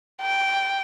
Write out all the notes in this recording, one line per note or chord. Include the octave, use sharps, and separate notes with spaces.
G5